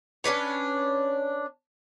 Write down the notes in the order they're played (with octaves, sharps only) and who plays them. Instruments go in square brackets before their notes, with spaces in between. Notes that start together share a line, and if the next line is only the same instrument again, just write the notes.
[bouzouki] C#4 D4 B4 C#5